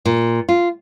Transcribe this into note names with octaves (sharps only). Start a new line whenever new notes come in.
A#2
F4